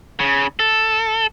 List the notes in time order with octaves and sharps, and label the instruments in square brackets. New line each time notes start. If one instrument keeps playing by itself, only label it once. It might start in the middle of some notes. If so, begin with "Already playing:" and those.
[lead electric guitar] C#3
A4